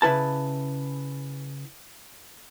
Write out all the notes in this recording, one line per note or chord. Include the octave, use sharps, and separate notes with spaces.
C#3 E4 B4 A5